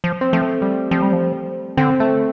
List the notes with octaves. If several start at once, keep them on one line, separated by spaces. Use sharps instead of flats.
F3
C4
F3 A3
G3
F3 C4
G3
F3
D3 C4
A3